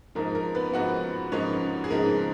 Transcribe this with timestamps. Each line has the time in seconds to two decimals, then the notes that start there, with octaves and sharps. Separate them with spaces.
0.15 G#2 F3 A#3 D#4 A#4
0.35 A#4
0.55 B3 B4
0.73 G#2 F3 A#3 D#4 F#4 F#5
1.32 G#2 F3 A#3 C#4 D#4 C#5
1.84 G#4
1.90 G#2 F3 A#3 D#4 A#4